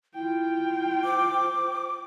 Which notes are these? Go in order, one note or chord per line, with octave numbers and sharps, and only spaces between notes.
E4 F4 G5
C5 D6